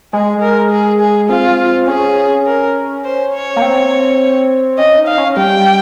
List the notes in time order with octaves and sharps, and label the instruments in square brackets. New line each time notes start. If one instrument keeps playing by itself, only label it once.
[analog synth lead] G#3 [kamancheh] G#4
[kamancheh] A#4
G#4
G#4
[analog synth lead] C4 [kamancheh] F4
[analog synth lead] C#4 [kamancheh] G#4
[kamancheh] A#4
C5
C#5
[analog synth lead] A#3
C4
[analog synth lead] C#4 [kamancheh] D#5
[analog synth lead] D#4
[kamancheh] F5
[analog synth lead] C#4
[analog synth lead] G3 [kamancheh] G5